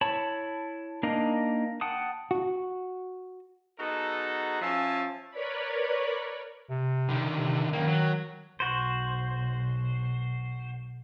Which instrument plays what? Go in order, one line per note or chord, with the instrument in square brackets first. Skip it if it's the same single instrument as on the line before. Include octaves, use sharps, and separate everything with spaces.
[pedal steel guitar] E4 C#5 A5 B5
A#3 D4 D#4 D#5 F5
F#5 G5 A5 D#6
[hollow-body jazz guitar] F#4
[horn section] B3 D#4 F#4 G#4 A4 A#5
F3 C#4 E5 F5 G#5 A5
[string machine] A#4 B4 C#5 D5 B5
[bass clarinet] C3
[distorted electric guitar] D3 D#3
[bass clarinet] C3
[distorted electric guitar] F#2 A#3 [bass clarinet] D#3
[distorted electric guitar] F#3
[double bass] B1 [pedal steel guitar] F#4 C5